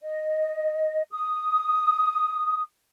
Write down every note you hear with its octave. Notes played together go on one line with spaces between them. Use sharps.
D#5
D#6